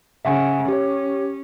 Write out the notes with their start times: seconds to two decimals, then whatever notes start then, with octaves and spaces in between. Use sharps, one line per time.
0.25 C#3 E5 F#5 G#5
0.68 C#4 G4 C#5